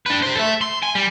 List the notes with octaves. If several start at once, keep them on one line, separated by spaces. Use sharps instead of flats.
D4 B4
G4 C5
A4 E5
C6
G#5
G3